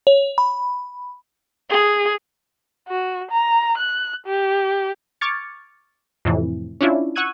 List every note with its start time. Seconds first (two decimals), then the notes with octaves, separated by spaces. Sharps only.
0.07 C#5
0.38 B5
1.70 G#4
2.89 F#4
3.31 A#5
3.78 F#6
4.26 G4
5.21 C#6 D6 F6 G#6 A6 C#7
6.25 F2 A2 C3 E3
6.81 C#4 D4 E4 F4
7.16 F#5 C#6 E6 F#6 G#6 D#7